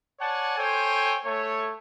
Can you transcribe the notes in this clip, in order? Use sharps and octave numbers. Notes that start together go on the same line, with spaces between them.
C#5 D5 F#5 G#5 A5
A4 C5 C#5 G5 G#5
A3 C#5